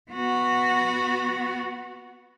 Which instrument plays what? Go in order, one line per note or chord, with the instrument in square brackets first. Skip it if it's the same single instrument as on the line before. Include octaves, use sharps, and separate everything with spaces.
[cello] B3 F#4